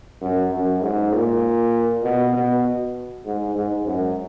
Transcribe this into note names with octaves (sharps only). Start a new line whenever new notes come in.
F#2
F#2
G#2
A#2
B2
B2
G#2
G#2
F#2